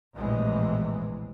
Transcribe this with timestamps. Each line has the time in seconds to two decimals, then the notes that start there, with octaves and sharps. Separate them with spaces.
0.15 A#1 E2 A2 C3 E3 G#3